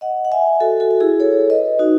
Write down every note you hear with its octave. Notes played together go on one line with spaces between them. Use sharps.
D#5 F#5
F#5
E5 G#5
F#4 A4
F#4 A4
F#4
E4 G#4
A4 C#5
B4 D#5
D#4 F#4